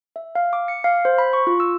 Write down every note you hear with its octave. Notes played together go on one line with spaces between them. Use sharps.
E5
F5
D6
C#7
F5
C5
B5
C#6
F4
E6